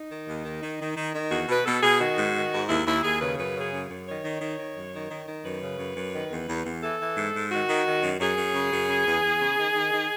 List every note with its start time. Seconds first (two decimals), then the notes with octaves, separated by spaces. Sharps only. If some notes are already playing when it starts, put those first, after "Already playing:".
Already playing: D#4
0.11 D#3
0.28 D#2
0.45 D#3
0.63 D#3
0.80 D#3
0.97 D#3
1.15 D#3
1.31 E2 F#4
1.48 B2 B4
1.66 B2 A4
1.83 B2 G#4
2.00 D#3 F#4
2.18 G#2
2.35 D#3
2.52 G#2
2.69 D#2 E4
2.86 D#2 E4
3.03 D#2 G#4
3.20 C#3 B4
3.38 F#2 B4
3.56 C#3
3.61 G#4
3.73 F#2
3.89 F#2
4.06 D#3 C#5
4.24 D#3
4.41 D#3
4.59 D#3
4.76 F#2
4.94 D#3
5.11 D#3
5.27 D#3
5.45 F#2 B4
5.62 C#3
5.79 F#2
5.96 F#2
6.14 D#3
6.31 E2
6.49 E2
6.66 E2
6.83 E3 A4
6.99 E3
7.17 G#2
7.35 G#2
7.51 D#3 F#4
7.69 D#3
7.86 D#3
8.03 F#2
8.20 F#2 G#4
8.37 F#2
8.55 C#3
8.73 F#2
8.89 C#3
9.06 E2
9.24 E2
9.41 C#3
9.59 D#3
9.75 D#3
9.93 D#3